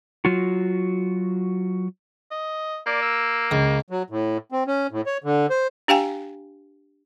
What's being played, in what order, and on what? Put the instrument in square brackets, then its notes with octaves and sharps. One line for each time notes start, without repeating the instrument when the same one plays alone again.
[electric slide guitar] F#3 F4 F#4
[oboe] D#5
[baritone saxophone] A#3 [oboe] D5
[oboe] E6
[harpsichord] C#2
[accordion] F#3
A2
C4
C#4
A2
C#5
D3
C5
[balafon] D4 G4 F5 G5 G#5